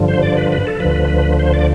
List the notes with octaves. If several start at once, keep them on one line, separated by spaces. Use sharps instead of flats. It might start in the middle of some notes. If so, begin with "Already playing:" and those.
Already playing: G2 D3 F3
C5
D5
B4
B4
A4
D2 D3 F3 B4
C5
D5